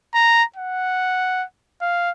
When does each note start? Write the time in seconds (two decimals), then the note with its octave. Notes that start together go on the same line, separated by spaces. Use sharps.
0.14 A#5
0.56 F#5
1.81 F5